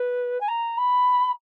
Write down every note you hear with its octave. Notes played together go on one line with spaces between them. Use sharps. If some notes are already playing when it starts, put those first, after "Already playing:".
Already playing: B4
G#5
A#5
B5